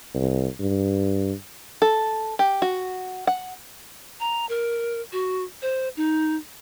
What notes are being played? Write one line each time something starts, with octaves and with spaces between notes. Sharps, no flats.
C2
G2
A4
G4
F#4
F#5
A#5
A#4
F#4
C5
D#4